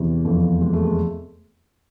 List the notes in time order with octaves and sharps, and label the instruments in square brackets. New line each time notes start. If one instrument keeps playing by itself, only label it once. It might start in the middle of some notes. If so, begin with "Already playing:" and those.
Already playing: [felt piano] E2 C3 E3
F2 F3
G#3
A3
G#3